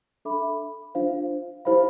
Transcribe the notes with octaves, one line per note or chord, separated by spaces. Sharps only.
D4 A4 E5 B5 D6
D4 F4 C5 F5
E4 G4 C5 F5 B5